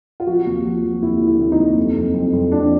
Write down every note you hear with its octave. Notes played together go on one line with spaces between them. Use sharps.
F4
F3 F#4
D#2
F3
F3
D#2 E4
D3
E4
D#2
D#4
D#2
F2
F2
F2
F2
F3 D4